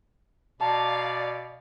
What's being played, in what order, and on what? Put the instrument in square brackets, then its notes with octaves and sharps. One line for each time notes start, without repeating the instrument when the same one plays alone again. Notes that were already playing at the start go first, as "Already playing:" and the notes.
[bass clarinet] B2 [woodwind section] D5 [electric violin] F5 [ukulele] F#5 A5 A#5